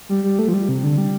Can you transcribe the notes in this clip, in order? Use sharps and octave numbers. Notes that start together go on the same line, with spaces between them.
G3
G3
A3
F3
G3
C3
D3
G3